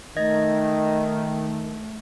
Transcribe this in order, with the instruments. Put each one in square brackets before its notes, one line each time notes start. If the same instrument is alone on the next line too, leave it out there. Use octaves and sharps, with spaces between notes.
[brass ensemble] D#3 [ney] A3 [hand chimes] D#5 G#6 A#6